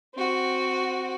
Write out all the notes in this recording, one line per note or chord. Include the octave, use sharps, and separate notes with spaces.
C4 F#4